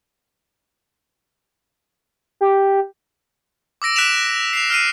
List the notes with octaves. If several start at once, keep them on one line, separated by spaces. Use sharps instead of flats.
G4
D6 E6 A#6 D7
F#6 B6 D7 E7 F7
C7 F7
F6 C7 D#7